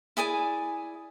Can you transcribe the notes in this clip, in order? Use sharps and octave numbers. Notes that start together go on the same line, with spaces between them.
E4 G#4 D5 G#5